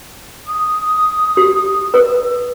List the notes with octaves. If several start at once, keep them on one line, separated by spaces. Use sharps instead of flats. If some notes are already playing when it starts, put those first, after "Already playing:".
D#6
G4
B4